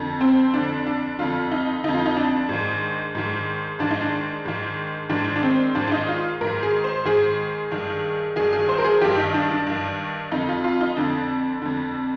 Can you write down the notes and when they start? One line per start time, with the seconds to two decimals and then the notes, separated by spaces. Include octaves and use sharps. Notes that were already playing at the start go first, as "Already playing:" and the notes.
Already playing: F2 D3
0.21 C4
0.54 F2 D3 D4
0.87 D4
1.19 F2 D3 F4
1.52 D#4
1.84 F2 D3 D#4
1.94 F4
2.06 D#4
2.17 D4
2.49 G#2 D#3
3.15 G#2 D#3
3.79 G#2 D#3 D4
3.91 D#4
4.01 D4
4.45 G#2 D#3
5.10 G#2 D#3 D4
5.36 D4
5.43 C4
5.75 G#2 D#3 D4
5.87 D4
5.92 D#4
6.08 F4
6.41 G#2 D#3 A#4
6.63 G#4
6.84 C5
7.05 G#2 D#3 G#4
7.71 G2 D#3
8.36 G2 D#3 G#4
8.53 G#4
8.69 C5
8.78 A#4
8.84 G#4
9.01 G2 D#3 G4
9.17 D#4
9.34 D4
9.51 D4
9.67 G2 D#3
10.31 F2 D3 D#4
10.49 F4
10.64 F4
10.81 D#4
10.97 F2 D3 D4
11.62 F2 D3